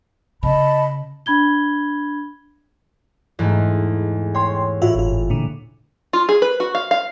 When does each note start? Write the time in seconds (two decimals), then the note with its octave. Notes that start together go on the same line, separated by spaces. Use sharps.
0.43 C#3 D#5 A5 B5
1.26 D4 B5 G#6 G7
3.39 E2 G#2 A3
4.35 C#5 G5 C6
4.82 A2 F4 F#4 E5
4.95 G1 F4
5.30 A#2 D3
6.13 F4
6.29 G#4
6.42 B4
6.60 F#4
6.75 F5
6.91 F5